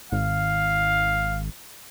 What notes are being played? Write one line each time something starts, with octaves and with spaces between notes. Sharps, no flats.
G#1 F5